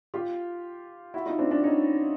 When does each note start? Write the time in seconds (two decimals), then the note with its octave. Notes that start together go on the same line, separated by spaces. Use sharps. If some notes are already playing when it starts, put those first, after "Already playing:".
0.14 F4 G4
1.14 E4 F#4
1.26 D#4 F4
1.39 C4 D4
1.51 C4 D4
1.64 C#4 D#4